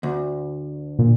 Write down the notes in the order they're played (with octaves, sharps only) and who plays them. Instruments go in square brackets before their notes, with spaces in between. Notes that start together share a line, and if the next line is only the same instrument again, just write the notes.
[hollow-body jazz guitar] D2
[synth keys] A#2